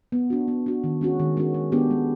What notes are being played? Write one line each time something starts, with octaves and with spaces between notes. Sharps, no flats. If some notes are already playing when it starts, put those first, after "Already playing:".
B3
D4 F#4
B3
D4 F#4
D#3
G#3 C#4 F#4
D#3
G#3 C#4 F#4
G#3
B3 D4 G4
G#3